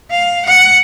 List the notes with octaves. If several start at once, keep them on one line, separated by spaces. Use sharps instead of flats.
F5
F#5